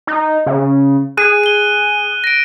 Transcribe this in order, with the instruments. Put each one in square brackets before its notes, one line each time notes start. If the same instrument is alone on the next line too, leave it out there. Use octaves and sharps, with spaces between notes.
[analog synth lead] D#4
C#3
[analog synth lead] G#4 [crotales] F#6 D#7
[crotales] D#7 G7
A#6 D7